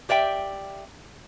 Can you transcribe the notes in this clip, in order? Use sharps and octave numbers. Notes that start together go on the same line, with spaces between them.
G4 D5 E5 G5